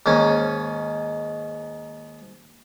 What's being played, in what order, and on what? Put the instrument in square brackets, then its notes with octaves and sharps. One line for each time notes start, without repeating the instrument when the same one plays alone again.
[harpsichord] D#2 G#2 C#4